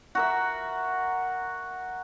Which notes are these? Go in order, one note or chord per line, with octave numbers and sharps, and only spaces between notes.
F#4 A#4 E5